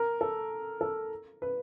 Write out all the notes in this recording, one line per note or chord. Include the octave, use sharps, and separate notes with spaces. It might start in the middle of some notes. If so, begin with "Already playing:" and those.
Already playing: A#4
A4
A4
B4